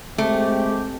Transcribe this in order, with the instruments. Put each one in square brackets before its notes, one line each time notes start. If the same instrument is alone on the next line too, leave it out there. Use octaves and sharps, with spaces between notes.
[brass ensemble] G#3 C4 G4 [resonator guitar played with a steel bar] A3